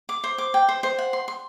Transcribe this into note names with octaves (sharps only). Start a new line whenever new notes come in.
D6
C5
D6
G5
C5
C5
F#5
C6
C6